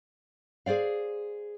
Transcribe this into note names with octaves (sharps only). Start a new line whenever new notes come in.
G#4 C5 D5 F5